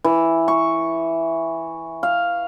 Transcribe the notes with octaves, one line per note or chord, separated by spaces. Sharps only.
E3
C#6
F5